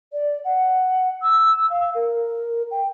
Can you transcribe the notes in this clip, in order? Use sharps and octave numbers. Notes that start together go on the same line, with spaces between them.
D5
F#5
E6
F5
A#4
G5